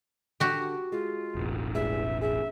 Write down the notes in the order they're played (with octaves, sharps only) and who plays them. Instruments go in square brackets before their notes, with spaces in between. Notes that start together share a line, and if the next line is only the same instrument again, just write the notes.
[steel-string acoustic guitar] D3 [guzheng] F#4 G4
[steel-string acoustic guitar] G#3 [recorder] F4
[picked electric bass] E1 A1
[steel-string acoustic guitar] E3 G3 G#3 [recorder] E5
[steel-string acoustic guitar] G#4 [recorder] E5